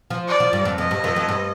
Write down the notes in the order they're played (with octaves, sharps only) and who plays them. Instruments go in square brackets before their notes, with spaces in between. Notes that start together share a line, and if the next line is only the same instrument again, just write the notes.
[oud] F3
[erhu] D5
[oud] F3
G2
F2
[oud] F2 [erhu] D#5
[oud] G2
F2
F2
G2